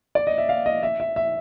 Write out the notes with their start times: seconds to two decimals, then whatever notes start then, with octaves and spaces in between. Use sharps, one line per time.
0.15 D5
0.27 D#5
0.38 E5
0.49 F5
0.66 D#5
0.83 E5
1.00 E5
1.16 E5